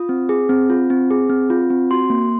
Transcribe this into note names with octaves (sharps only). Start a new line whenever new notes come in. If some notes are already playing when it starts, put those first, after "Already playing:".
Already playing: F4 D#6
C4
G#4
C4
F4
C4
G#4
C4
F4
C4
F#4 C6
A#3